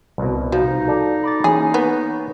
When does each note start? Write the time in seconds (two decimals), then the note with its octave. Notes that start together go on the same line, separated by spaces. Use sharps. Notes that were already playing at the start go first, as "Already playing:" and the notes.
0.18 C2 B2
0.52 F3 D#4 F#4 F5
0.88 A4 D5 A5
1.23 B5 D6 A6
1.44 E3 A#3 C#4 G#4 G#5
1.74 B3 C#6